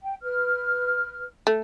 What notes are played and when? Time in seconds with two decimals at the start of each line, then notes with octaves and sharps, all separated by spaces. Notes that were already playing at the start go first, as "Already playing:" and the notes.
0.01 G5
0.22 B4 F6
1.47 A3